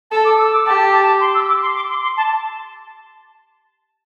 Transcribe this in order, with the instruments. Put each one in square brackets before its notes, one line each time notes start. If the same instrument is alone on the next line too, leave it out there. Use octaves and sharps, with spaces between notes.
[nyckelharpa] A4 [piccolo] A5
[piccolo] D6
E6
D6
[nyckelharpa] G4 [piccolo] A5
[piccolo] A5
C6
E6
D6
C6
D6
C6
C6
A5